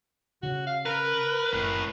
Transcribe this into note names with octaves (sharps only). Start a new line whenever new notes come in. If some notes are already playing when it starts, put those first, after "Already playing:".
C#3 F#4
F5
A#4 B4
F#1 A2 B4